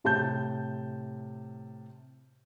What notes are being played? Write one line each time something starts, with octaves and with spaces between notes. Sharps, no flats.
A2 C3 A5 G6